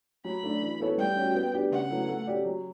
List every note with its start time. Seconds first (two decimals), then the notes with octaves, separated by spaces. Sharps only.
0.25 F#3 B5
0.43 A3 D4
0.61 E3
0.80 B3 E4 A4 C#5
0.98 G3 G5
1.16 C#4 F#4
1.35 B3
1.54 D4 G4
1.71 C#3 F#5
1.89 F#3 B3 E4 A4
2.08 A3
2.27 C#4 G4 D5
2.45 F#3